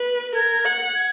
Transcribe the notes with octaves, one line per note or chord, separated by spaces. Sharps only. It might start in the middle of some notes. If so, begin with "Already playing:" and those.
Already playing: B4
A#4 G#6
F#5
G#6